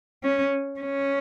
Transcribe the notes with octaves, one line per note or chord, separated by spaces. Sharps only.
C#4
C#4